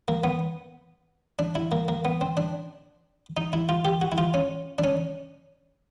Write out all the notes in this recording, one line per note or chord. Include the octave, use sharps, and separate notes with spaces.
A#3
B3
D4
E4
A#3
A#3
B3
C4
D4
D#4
E4
F4
G4
F#4
E4
F4
C#4
D4
C#4